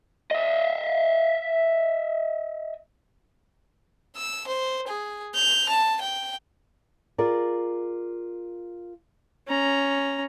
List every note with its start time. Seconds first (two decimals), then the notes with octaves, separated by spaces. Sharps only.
0.31 D#5 E5
4.16 E6
4.47 C5
4.87 G#4
5.35 G6 F7
5.69 A5
6.01 G5
7.18 F4 G#4 A#4 D5
9.48 C#4 A#5